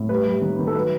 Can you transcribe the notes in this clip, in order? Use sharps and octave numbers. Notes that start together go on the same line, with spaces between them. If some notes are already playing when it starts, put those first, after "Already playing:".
Already playing: A2
G3 B4
G3
D#3
D#3
A4
F#3 B4